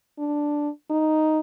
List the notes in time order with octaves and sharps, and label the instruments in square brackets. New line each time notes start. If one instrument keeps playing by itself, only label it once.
[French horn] D4
D#4